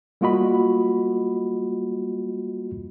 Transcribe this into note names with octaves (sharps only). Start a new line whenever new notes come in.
G3 A#3 F4 F#4 D#5 B5